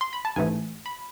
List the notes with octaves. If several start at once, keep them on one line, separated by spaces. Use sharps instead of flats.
C6
B5
A5
A1 G#2 E3 A3 G#5
B5